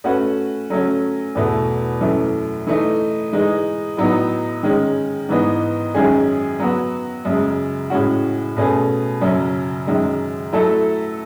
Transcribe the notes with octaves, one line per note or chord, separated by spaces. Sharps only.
A3 C#4 F#4 B4
F#3 A3 C#4
E2 B2 A3 E4
F#2 E3 A3
E3 A3 D#4
E3 G#3 D#4
A2 F#3 B3 D#4
D#3 G#3 C#4
G#2 E3 B3 D#4
F#2 D#3 G#3 C#4 G#4
F#3 B3 F#4
F#2 C#3 G#3
A2 G#3 C#4 F#4
B2 A3 C#4 G#4
F#2 C#3 F#3 C#4
F#2 D#3 G#3
F#3 A3 E4 A4 E5